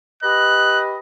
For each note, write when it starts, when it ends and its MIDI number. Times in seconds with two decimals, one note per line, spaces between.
0.23 0.97 67
0.23 0.97 71
0.23 0.97 75
0.23 0.82 90